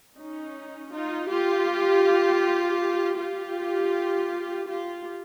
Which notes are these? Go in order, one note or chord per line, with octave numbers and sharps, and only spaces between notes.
C#4 D#4
D#4 F4
F4 G4
F4 G4
F4 G4